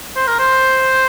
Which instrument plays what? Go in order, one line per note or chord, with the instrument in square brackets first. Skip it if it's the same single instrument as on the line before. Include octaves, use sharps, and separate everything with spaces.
[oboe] C5
A#4
C5